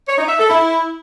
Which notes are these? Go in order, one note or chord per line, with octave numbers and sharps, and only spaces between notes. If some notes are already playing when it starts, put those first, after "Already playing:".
C#5
D#4
E5
A4
E4